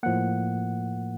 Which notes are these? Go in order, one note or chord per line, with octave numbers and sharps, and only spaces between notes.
A2 F3 A#3 F#5